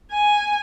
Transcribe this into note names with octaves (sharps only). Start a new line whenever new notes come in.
G#5